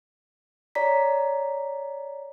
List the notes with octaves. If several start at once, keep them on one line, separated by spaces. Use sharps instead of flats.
C#5 D5 A#5 B6